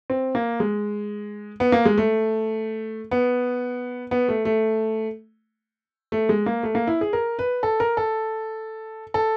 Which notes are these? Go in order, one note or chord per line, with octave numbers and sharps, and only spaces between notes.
C4
A#3
G#3
B3
A#3
G#3
A3
B3
B3
A3
A3
A3
G#3
A#3
A3
A#3
E4
G#4
A#4
B4
A4
A#4
A4
A4